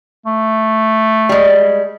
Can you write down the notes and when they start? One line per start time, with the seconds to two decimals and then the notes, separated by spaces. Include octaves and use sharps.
0.26 A3
1.29 G3 G#3